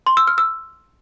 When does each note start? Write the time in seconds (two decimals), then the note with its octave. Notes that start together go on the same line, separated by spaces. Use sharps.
0.07 C6
0.17 E6
0.27 F6
0.38 E6